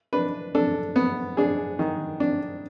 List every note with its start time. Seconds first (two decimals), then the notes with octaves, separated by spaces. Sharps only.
0.13 D4 B4
0.55 D4 A4
0.96 B3
1.37 D4 G#4
1.79 D#3
2.20 D4